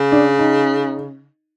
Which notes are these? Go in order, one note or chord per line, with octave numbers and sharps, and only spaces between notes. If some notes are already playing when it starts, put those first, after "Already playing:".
Already playing: C#3
D4
D#4